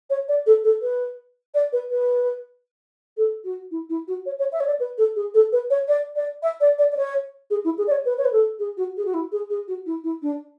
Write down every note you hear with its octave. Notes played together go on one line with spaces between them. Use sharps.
C#5
D5
A4
A4
B4
D5
B4
B4
A4
F#4
E4
E4
F#4
C#5
C#5
E5
C#5
D5
B4
A4
G#4
A4
B4
C#5
D5
D5
E5
D5
D5
D5
C#5
G#4
E4
G#4
D5
C#5
B4
C#5
B4
A4
G#4
F#4
G#4
F#4
E4
G#4
G#4
F#4
E4
E4
D4